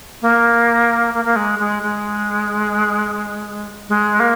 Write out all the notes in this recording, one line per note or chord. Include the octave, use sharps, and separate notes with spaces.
A#3
A#3
A#3
G#3
G#3
G#3
G#3
A#3